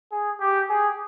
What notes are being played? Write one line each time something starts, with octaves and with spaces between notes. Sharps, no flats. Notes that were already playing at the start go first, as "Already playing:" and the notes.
G#4
G4
G#4